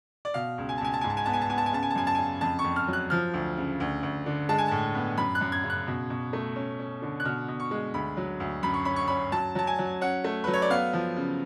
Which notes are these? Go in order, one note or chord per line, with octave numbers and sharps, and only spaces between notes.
D5
B2 F5
C#2
G#5
A5
C#2 G#5
A5
G#2 G#5
A5
G#5
B3 A5
G#5
A5
B3 G#5
A5
G#5
C#3 A5
G#5
A5
F#2 G#5
A5
C#3 G#5
F2 A5
C#6
F2
F6
F#3
F#6
F3 F6
D2
C#3
D2
D2
D3
G#3 A5
G#5
A2 A5
B3
F#2 B5
F#6
F#2
G#6
C#3
F#6
B2
B2
A3
C#4
C#4
D3
F#6
B2 F6
B2
C#6
G#3
D2 B5
F#3
D2
F#2 B5
C#6
C#4 B5
C#6
C#4 B5
F#3 A5
F#3 A5
G#5
F#3
C#4 F#5
A3
F#3 B4
C#5
D5
B3 F5
F3
C#3